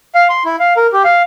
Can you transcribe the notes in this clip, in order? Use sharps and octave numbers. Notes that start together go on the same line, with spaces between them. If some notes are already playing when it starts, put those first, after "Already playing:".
F5
C6
E4
F5
A#4
G4
F5